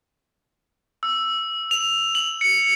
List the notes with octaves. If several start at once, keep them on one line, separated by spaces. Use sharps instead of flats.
E6
F7
F#7
C#7